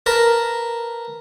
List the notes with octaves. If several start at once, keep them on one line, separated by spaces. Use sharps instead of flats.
A#4 B4 A5